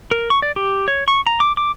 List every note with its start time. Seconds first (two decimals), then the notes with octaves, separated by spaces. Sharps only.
0.11 A#4
0.30 C#6
0.42 D5
0.56 G4
0.88 C#5
1.08 C#6
1.27 A#5
1.40 D6
1.57 D6